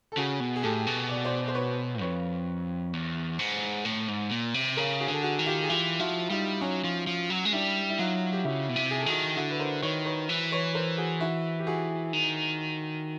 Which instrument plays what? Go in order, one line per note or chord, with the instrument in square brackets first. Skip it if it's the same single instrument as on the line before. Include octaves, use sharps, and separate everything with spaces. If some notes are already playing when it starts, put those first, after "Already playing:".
[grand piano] A4
[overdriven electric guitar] C#3 [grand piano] F#4 G#4
[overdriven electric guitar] B2
[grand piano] G#4
[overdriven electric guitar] A2 [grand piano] G4 A4
[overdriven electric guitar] B2
[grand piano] D5
C5 D5
C5
B4 C#5
[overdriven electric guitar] F2 [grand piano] B4 C#5
[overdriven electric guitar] E2
G#2
A2
G#2
A#2
C3
[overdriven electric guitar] C#3 [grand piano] G#4 A#4
[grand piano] F#4 G#4
[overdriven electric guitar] D3
[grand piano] A4
F#4 G#4
[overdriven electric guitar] D#3
[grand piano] F4 G4
G#4
[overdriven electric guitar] E3 [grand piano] F4 G4
[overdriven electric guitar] F3 [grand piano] E4 F#4
[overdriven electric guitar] G3 [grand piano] D#4 F4
[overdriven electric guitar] F#3 [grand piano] C#4 D#4
[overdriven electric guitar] F3
F3
F#3
G#3
[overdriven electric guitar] G3 [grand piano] D4 E4
[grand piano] E4
[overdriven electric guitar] F#3 [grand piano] D#4 F4
[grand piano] G4
[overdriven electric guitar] C#3 [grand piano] E4 F#4
[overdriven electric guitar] B2
C3
[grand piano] G#4
A4
[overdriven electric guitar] D#3 [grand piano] F#4 G#4
[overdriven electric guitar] D3 [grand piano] E4 F#4
[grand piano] B4
A#4 C5
[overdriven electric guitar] D#3 [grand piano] B4 C#5
[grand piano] B4 C#5
[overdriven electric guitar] E3
[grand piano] B4 C#5
A#4 C5
F#4 G#4
E4 F#4
G4
F#4 G#4
[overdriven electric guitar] D#3